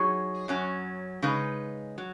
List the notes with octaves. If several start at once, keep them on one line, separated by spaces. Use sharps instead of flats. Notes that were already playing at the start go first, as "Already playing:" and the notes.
Already playing: F#3 D#4 G#4 C#5
F#2 F#3 C#4
C#3 G#3 D#4 B4
F#3